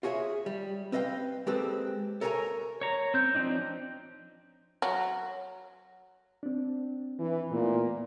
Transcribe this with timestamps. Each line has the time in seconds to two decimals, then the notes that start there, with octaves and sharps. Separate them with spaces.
0.03 F4 F#4 G#4 C#5 E5
0.46 G3
0.92 C4 B4 D#5 F5 G5
1.47 G#3 A#3 C4 G4 A4 B4
2.21 A4 A#4 C#5 D5 G#5 A#5
2.81 C#5 A#5
3.14 C4 G6
3.35 F3 C4 D4 D#4
4.82 F#3
6.43 C4 D4
7.19 E3
7.51 A#2 A3 B3 E4